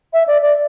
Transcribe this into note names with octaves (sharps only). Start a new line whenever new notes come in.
E5
D5
D5